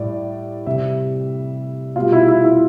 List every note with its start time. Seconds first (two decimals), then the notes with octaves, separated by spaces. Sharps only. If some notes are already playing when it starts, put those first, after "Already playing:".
Already playing: A2 G3 D5
0.66 C3 G3 E5
1.96 B2 G3 F4
2.12 E4
2.28 E4
2.44 E4